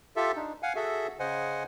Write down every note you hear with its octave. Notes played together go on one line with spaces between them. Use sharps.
F4 G4 A4 E5
D4 D#4
F5 F#5 G#5
F#4 G#4 A4 E5
C#3 C5 D#5 F#5 G#5